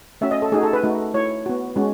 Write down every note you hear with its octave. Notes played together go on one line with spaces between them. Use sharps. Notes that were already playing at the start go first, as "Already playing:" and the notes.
A3 C#4 F#4 E5
D#5
A4
A3 D#4 F#4 G#4
A4
B4
A3 D#4 F#4
A3 E4 C#5
B3 F#4
G#3 C#4 F#4